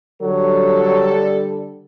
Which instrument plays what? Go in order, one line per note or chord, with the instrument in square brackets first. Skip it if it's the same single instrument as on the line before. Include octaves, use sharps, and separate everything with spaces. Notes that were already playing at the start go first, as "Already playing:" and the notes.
[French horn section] D3 G3 A4 [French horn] F#3